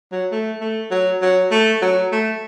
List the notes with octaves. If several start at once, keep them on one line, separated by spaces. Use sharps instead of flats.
F#3
A3
A3
F#3
F#3
A3
F#3
A3